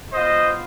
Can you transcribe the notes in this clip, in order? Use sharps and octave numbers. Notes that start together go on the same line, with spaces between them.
B3 F4 C5 D#5